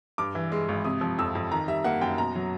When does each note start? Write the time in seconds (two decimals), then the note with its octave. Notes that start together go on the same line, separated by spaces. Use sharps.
0.18 G2 D6
0.35 E3
0.52 G#3
0.68 G#1
0.84 C3 D#6
1.01 F3
1.18 F2 E6
1.35 F2
1.51 D#3 A#5
1.68 G3 E5
1.84 A#3 F#5
2.01 F#2 G5
2.18 B2 A#5
2.35 F#3